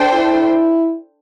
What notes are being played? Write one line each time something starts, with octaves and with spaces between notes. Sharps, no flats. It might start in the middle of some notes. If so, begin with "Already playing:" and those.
Already playing: D4 A4 C5 G5
E4